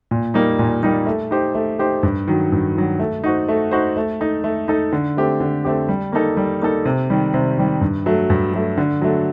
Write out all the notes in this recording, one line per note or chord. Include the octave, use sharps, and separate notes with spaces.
A#2
G3 A#3 D#4
A#2
G3 A#3 D#4
A3
D#4 G4 C5
A3
D#4 G4 C5
G2
D#3 F#3
G2
D#3 F#3
A3
D#4 F#4 C5
A3
D#4 F#4 C5
A3
D#4 A4
A3
D#4 A4
D3
A3 C4 G4
D3
A3 C4 G4
G3
A#3 D#4 A4
G3
A#3 D#4 A4
C3
D#3 G3
C3
D#3 G3
G2
F#3 A3
G2
F#3 A3
D3
F#3 A3